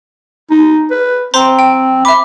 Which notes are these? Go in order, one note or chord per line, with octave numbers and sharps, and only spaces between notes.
D#4
B4
C4 C5 A#5 C6
G5
E5 B5 D6